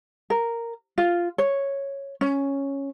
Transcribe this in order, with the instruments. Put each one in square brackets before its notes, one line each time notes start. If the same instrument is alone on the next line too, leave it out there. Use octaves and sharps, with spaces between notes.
[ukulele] A#4
F4
C#5
C#4